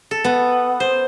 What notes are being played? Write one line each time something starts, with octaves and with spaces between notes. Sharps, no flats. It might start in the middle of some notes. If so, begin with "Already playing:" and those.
A4
B3
C5